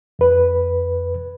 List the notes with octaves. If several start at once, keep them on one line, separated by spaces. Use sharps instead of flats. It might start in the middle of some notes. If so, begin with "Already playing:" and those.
F2 B4